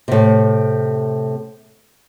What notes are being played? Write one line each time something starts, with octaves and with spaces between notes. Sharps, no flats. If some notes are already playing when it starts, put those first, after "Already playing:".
A2 C3